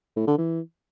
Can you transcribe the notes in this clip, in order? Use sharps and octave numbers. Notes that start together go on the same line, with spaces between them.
A2
D3
E3